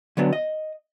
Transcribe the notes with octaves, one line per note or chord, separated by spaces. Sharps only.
D3 F#3 B3 D4
D#5